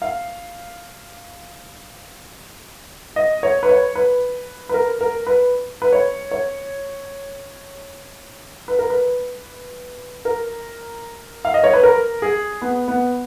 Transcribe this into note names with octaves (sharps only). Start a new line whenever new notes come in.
F5
D#5
C#5
B4
C#5
B4
B4
A#4
A#4
B4
B4
C#5
C#5
B4
A#4
B4
A#4
F5
D#5
C#5
B4
A#4
G#4
B3
B3